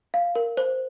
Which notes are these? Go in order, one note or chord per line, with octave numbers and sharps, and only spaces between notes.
F5
A#4
C5